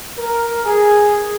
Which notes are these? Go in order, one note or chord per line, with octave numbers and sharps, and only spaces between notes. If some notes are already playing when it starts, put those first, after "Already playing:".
A#4
G#4